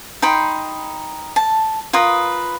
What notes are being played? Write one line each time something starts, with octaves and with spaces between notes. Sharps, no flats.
D#4 G5 B5 C6
A5
F4 A#4 B4 D#6